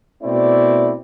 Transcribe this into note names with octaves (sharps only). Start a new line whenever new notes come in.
B2 A3 C4 E4 D5